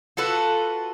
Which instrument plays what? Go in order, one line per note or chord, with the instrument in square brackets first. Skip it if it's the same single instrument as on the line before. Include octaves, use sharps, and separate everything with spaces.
[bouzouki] F4 F#4 A4 B4